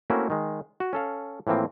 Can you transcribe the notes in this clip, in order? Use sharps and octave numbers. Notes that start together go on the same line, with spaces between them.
A3 A#3 C4 C#4 E4 F#4
D#3 G#3
F#4
C#4 A4 F5
A2 E3 F3 A#3 C4